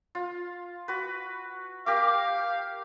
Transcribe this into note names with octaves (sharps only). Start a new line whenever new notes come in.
F4
F#4 B4
G4 A#4 F5 D6